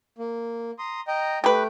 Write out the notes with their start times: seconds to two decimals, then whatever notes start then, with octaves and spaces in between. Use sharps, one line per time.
0.18 A#3
0.79 A#5 C6 D#6
1.08 D#5 G5 A#5
1.44 A3 G4 B4 G5